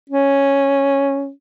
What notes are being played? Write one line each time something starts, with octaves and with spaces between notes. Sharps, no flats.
C#4